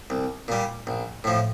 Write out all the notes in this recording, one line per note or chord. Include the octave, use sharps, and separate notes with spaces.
C2
A#2 G3
A#1
A2 F3